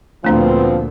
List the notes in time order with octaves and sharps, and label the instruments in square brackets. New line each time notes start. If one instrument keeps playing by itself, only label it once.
[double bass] D2 A#2 [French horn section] F3 B3 C4 [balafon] A3 D4 A#5